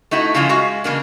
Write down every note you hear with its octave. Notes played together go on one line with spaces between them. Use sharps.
A3 D#4 E4 F#4
C#3 E3 F3 G#3 E4 F4
G#3 F#4 F5
C#3 E3 A#3 D4